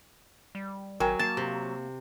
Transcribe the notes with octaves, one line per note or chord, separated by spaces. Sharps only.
G3
G#1 F#3 A#4 G5 G#5
A#3 A5
C3